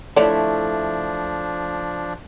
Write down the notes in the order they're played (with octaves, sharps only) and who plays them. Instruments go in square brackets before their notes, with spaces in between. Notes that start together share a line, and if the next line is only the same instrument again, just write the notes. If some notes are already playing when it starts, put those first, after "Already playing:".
[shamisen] D3 C#5 D5 [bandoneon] F3 D4 [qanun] A3 E4